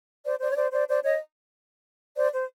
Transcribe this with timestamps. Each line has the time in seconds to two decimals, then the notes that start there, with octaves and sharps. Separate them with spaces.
0.24 C5 D5
0.40 C5 D5
0.52 C#5
0.56 C5 D5
0.72 C5 D5
0.88 C5 D5
1.04 C#5 D#5
2.16 C5 D5
2.32 C5